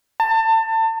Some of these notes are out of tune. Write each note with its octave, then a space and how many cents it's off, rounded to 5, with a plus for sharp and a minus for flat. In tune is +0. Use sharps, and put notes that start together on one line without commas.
A5 +30